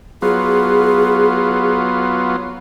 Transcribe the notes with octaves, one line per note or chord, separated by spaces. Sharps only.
F#3 B3 F4 G#4